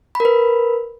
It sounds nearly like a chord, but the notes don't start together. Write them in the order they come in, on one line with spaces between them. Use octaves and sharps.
B5 A#4 B4